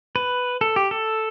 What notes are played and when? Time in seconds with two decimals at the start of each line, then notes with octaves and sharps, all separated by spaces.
0.16 B4
0.61 A4
0.76 G4
0.91 A4